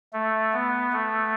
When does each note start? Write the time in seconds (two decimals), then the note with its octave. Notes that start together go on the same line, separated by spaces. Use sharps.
0.13 A3
0.53 B3
0.93 A3